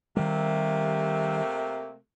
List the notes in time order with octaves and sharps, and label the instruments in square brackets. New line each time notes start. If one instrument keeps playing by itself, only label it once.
[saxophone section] C3 A3 A#3 [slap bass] D#3 G3